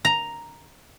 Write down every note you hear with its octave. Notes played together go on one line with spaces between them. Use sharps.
A#5